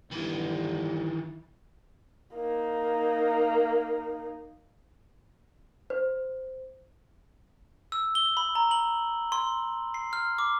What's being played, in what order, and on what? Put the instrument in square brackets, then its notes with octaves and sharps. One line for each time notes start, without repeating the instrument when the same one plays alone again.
[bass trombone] G1 [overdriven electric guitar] D#3 E3
[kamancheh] A#3 D#4
[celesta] C5
[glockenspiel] E6
G7
B5
A#5
F#7
C6
C7
F6
D6